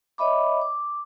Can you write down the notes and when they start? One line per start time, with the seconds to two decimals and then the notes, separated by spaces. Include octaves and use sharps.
0.18 C#5 D#5 E5 B5 D6
0.61 D6